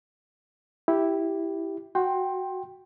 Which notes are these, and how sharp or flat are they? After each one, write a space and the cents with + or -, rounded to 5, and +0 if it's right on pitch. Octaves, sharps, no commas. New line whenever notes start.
E4 +0 G4 +0
F#4 +0 G5 +0 C6 +20